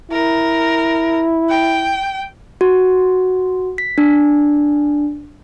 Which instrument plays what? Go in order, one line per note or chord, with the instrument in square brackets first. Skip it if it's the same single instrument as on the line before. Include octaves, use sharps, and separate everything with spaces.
[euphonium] E4 [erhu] A#4
[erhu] G5
[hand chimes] F#4
B6
D4